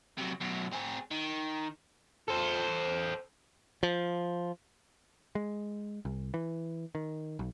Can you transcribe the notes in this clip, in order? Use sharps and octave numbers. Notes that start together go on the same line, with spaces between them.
C3 F#3
F#2 B2
C4 G#4
D#3
A4 C5
F3
G#3
C2
E3
D#3
B1